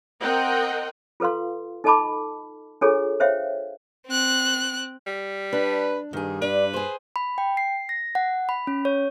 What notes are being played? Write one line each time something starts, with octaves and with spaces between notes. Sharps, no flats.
C4 A#4 D#5 F#5 G5
F4 A4 B4 F5 C6
D#4 A4 D#5 A5 B5 D6
D4 F4 G#4 A4 C#5 G#5
C5 C#5 E5 F5 G5
C4 F#6
G3
D4 B4
G2 D#3 G#4
D4 B4 D5
G#4 C5
B5
G5
C7
A#6
F#5
B5
C#4
C#5